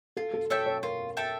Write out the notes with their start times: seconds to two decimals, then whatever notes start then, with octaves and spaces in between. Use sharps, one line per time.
0.17 F4 A4
0.34 A4
0.50 A4 C#5 E5 G5
0.66 C#5
0.83 F4 A#4
1.17 A4 E5 G5